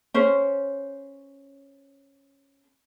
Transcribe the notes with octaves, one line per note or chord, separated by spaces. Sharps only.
C#4 C5